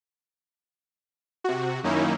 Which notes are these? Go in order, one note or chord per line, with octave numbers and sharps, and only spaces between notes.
C3 F#4
F#2 D#3 A#3 C#4 D#4 E4